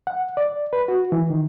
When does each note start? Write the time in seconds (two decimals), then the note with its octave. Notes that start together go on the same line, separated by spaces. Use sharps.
0.07 F#5
0.37 D5
0.73 B4
0.88 F#4
1.12 E3
1.30 D#3